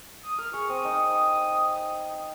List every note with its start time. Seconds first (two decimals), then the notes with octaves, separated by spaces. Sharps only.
0.23 D#6
0.38 A#4 F6
0.53 G#4 C#6
0.69 C4 D#6
0.85 D#4